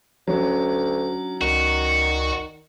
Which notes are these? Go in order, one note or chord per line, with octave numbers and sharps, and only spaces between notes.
D2 F#3 C#4 D4
C#2 D#3 F#4 D5